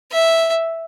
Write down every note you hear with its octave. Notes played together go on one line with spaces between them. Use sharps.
E5